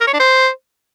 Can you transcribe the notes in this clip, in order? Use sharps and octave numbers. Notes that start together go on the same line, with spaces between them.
A#4
C#5
D4
C5